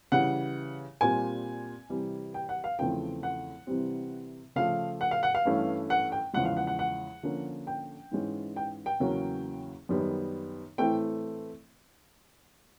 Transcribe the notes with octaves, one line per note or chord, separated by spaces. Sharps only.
C#3 E3 G3 F#5
A#2 G3 C4 G#5
C3 E3 G3
G5
F#5
F5
E2 C#3 F3 A3 C4 G5
F#5
C3 E3 G3 C4
C#3 F3 A3 F5
F#5
F5
F#5
F5
G2 E3 A3 C#4
F#5
G5
E2 C#3 F3 G#3 F#5
F5
F#5
F#5
F#5
D3 F3 A#3 C#4
G5
G#2 E3 G#3 C#4
G5
G5
E2 C#3 F#3 A#3 C#4
F#2 D#3 G3 B3
A2 E3 A3 C4 G5